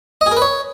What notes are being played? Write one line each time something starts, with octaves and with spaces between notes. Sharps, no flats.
D#5
G#4
A#4
B4
C#5